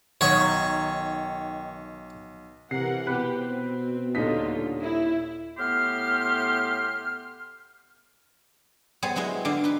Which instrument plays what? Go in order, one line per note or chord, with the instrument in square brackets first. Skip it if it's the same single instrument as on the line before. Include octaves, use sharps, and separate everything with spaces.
[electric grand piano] B1 F#5 D#6 [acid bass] D#3 [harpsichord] C#5 C#6
[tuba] C3 [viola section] E3 A#4 F#5 [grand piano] C7
[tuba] B2 [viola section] G4 [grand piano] B4
[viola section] C4
[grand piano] D#1 D#4 B6 [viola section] D3 F4
[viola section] E4
[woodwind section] A2 B3 G4 C6 F6
[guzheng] G3 B3 G#4 C5 C#5 G#5
F#3 G#3 E4 G#4
D3 D4 F5
D#4 B4